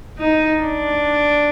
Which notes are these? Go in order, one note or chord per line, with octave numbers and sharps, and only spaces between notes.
D#4
D4